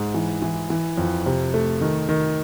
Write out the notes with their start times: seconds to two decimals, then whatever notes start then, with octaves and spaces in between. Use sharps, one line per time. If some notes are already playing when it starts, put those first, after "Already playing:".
Already playing: G#2
0.14 E3
0.42 E3
0.70 E3
0.98 F2
1.26 C3
1.54 A3
1.81 D#3
2.09 D#3